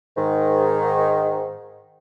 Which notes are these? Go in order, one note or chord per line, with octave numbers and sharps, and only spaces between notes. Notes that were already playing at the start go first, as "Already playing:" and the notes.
G#2 D#3